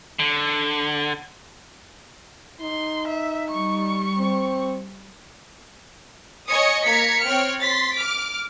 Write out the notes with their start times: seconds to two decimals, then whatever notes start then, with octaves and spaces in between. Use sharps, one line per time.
0.19 D3
2.61 D#4 C6
3.07 E5
3.52 G3 C#6
4.18 C4
6.50 C#5 D#5 G#5 C#6 D#6 C#7
6.87 A#3 A#5 G#6 B6 C#7
7.26 C4 C#5 G5 F6
7.61 C6 A6 B6
7.96 D6 F6